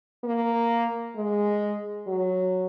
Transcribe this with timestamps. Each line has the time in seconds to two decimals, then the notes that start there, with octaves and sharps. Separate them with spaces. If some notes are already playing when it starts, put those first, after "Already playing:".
0.24 A#3
1.16 G#3
2.07 F#3